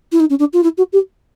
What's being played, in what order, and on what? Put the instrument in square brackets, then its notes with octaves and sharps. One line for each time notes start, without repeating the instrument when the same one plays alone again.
[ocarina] E4
D#4
C#4
D4
F4
E4
F#4
G4